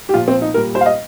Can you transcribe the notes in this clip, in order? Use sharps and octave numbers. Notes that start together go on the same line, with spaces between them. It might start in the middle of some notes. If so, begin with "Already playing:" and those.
G4
A#2 F3 F4
C4
D#4
A#2 G3 A#4
C5
F5
D#5